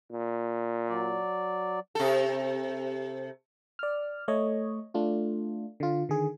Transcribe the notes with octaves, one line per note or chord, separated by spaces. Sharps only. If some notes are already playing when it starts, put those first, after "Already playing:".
A#2
F#3 D5
C3 A4
D5 F6
A3 C#5 D#5
A3 D4 F4
D3 F4
D3 D#3 G#4